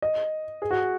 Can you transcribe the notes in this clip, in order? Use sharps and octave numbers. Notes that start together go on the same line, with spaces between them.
D#5
G#4
F#4